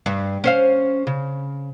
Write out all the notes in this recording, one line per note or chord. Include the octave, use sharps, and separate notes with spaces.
G2
C#4 C5 F5
C#3